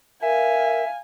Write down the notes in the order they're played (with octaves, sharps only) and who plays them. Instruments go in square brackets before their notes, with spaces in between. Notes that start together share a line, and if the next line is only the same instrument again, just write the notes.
[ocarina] A#4 [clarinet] E5 [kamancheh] F5 G#5